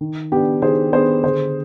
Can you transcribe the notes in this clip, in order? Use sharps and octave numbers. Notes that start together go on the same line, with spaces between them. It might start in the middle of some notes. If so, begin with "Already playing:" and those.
D#3
B3 D4 G4
D#3 G#4 C5
B3 D4 G#4 C5
D3 G#4 C5